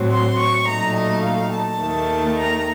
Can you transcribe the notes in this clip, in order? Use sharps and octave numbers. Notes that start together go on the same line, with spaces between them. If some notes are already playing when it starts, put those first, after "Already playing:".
Already playing: A2 F#3 C4
C6
C#6
A#2 F#3 A3 D#4 A#5
D#5
F5
A5
D#2 D#3 A3
A#5